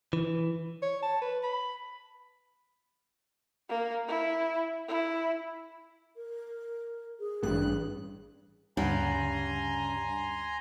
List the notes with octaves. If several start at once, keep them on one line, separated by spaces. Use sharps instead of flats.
E3
C#5
A5
B4
B5
A#3
E4
E4
A#4
G#4
A1 G2 F#6
D2 G2 C#3 G3 F#5 G#5 A#5 C6